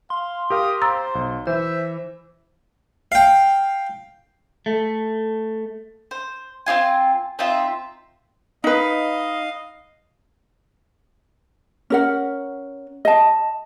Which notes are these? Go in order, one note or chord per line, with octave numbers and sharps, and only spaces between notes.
F5 C6
G4 A#4 F5 D#6
C5 A#5 E6 A6
B1
E3 C5 E5
F5 G5
A3
C5
C4 D#4 F4 G#5
C4 D#4 F4 E5
D#4 B4 D#5 F5
C#4 A#4 F#5
D#5 A5